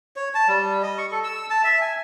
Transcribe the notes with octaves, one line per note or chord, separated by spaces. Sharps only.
C#5
A5
G3
D#5
C#6
A4
E6
A5
E5
G#5